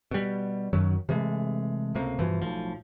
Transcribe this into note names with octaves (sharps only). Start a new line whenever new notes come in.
B2 G3
F#2 D#3 F#3
C3 E3 G#3 A3
C#2 A2 C3 A#3
G2 B2 E3 F3
B1 A2 F3